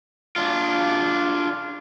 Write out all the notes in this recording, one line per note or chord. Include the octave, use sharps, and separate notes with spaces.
D4 F4